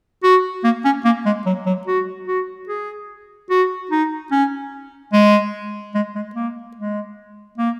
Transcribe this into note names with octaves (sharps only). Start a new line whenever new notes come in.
F#4
A#3
C#4
A#3
G#3
F#3
F#3
F#4
F#4
G#4
F#4
D#4
C#4
G#3
G#3
G#3
A#3
G#3
A#3